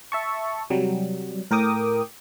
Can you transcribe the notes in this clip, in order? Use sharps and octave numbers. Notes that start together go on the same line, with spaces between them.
E5 A5 C#6
C3 F#3 G3
A2 A#4 G5 D6 D#6